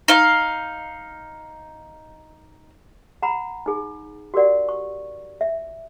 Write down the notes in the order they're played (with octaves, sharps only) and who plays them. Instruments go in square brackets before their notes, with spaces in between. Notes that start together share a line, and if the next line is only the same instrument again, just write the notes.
[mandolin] D#4 F5
[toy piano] F#5 A#5 B5
D#4 G#4
F#4 G4 A#4 D5 F#5
C#6
E5